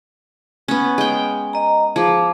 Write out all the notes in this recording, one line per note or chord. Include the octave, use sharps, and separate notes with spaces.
B3 C#4
G#3 G5
D#5 A#5
F3 G#4 D6